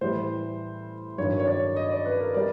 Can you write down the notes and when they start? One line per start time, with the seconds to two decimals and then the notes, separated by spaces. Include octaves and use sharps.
0.01 A2 E3 G3 C5
1.18 G2 D#3 F#3 C#5
1.40 C#5
1.47 D5
1.76 D#5
1.91 D5
2.05 B4
2.20 A#4
2.34 E3 G3 D5